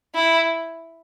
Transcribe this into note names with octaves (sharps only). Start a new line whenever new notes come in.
E4